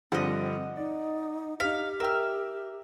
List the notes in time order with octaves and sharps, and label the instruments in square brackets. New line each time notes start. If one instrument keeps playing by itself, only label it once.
[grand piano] G2 D3 F3 [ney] C4 [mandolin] D#5 F#5
[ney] D#4 [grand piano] D5
[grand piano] D#4 B6 [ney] G4 [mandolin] F5
[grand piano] A#4 G5 [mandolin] E5 F6